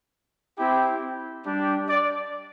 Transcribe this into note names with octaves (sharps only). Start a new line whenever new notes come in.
C4 E4 G4 G5
G3 D4 G4
D5